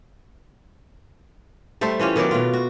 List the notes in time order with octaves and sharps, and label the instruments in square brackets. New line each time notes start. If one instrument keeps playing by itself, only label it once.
[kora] G3 A3 A4 C5
E3 C#4 F4 G4
D#3 F#3 B3 D5
B2 F4
F#4